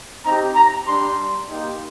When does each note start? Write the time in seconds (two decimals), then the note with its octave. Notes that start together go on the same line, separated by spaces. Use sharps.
0.24 C4 D#4 G4 A#5
0.55 A#5
0.86 G3 D4 G4 C6
1.49 A#3 D#4 G4